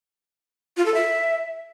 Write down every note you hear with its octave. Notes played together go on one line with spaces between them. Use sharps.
F4
A4
E5